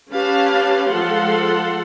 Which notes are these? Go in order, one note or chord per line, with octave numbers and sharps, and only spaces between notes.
C#4 G4 B4 F5 A5
F3 G#3 A4 F5 F#5 C6